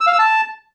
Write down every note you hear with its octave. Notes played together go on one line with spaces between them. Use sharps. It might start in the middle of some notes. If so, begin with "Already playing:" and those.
E6
F5
E6
A5